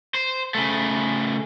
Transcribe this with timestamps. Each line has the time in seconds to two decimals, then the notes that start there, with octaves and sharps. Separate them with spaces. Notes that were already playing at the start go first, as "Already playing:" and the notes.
0.14 C5
0.55 C#3 A3